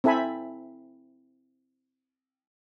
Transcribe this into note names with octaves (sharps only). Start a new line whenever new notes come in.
C4 E4 A4 E5 G#5 B5